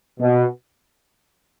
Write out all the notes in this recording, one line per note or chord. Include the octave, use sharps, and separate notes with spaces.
B2